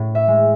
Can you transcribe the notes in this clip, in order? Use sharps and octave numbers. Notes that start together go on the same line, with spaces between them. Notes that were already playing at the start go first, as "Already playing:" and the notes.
Already playing: A2
E5
G#3